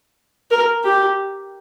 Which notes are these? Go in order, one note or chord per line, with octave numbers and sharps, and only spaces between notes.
A#4
G4